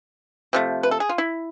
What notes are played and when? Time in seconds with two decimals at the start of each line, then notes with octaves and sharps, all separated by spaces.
0.53 C3 F3 A3
0.83 B4
0.91 A4
1.00 G#4
1.09 F4
1.18 E4